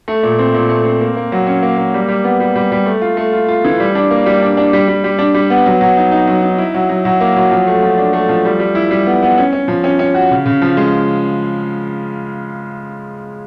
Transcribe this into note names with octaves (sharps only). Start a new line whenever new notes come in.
A3
A#2
C4
A#2
A3
C4
A#3
A#3
F#3
C#4
A#3
A#3
G3
G3
B3
G3
G3
G3
A3
F4
A3
F4
F4
E3
G3
D4
A#3
G3
D4
D4
G3
G3
G3
D4
G3
B3
F#3
F#3
D#4
D#4
F#3
D#4
E4
F#3
F#3
F#3
A#3
F#3
F3
A3
F3
D4
A3
F3
G3
G3
E4
G3
B3
B3
C#4
C#4
F3
C#4
C#4
F#4
C#3
C#3
F3
G#3